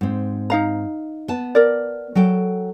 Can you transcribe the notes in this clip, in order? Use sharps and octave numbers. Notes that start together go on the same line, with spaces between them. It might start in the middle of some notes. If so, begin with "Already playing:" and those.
G#2 C4
D#4 F5 A#5
B3 A5
A#4 D5
F#3 A4 G5